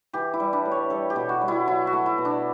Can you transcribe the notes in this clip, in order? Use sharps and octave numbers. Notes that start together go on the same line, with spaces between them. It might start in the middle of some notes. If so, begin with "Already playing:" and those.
E3 G4
E4
G3
D4
A2
C#5
G3 A4
G4
B2
F#4
G3
E4
F#3 E4
F#4
A3
E4
B2
D4